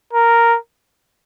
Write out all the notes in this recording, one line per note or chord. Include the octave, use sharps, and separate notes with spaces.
A#4